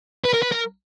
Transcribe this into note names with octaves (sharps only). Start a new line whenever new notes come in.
B4
A#4
B4
A#4